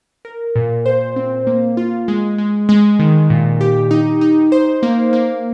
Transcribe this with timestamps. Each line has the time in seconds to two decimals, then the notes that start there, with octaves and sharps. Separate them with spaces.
0.25 A#4
0.56 A#2
0.86 C5
1.16 C4
1.47 A#3
1.77 F4
2.08 G#3
2.38 G#3
2.69 G#3
2.99 D#3
3.30 A#2
3.61 G4
3.91 D#4
4.21 D#4
4.52 C5
4.83 A#3
5.13 A#3